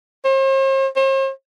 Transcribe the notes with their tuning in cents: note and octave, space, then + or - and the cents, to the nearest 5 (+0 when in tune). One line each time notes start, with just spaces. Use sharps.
C5 +45
C5 +45